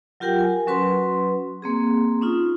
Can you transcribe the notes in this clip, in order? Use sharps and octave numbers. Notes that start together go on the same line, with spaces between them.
F#3 F4 G4 A#4 F#5 G5
A#4 G#5
F#3 C#4 F#4 B4 C6
A#3 C4 G#4
C#4 D#4 F4